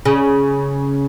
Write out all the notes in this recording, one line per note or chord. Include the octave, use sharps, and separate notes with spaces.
C#3